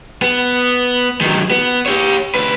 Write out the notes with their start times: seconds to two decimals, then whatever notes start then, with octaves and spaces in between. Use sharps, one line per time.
0.22 B3
1.21 D#3 F#3
1.51 B3
1.86 G4 C#5
2.35 D2 B4